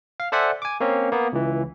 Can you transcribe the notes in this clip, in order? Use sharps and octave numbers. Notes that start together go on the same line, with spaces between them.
F5
A4 C5 D5 E5 F#5 G#5
G#5 D6
A#3 C4 C#4
A#3 B3
C#2 E3